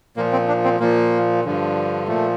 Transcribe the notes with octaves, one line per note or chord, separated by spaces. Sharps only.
A#2 F3 A#3
C4
D4
C4
A#2 F3 A#3
G2 D3 F3
A#2 F3 A3